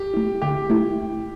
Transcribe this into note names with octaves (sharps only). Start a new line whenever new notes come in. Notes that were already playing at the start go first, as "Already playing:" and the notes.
Already playing: G4
A3 E4
D3 G4
A3 E4